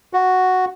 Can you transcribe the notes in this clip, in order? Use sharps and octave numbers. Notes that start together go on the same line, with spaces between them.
F#4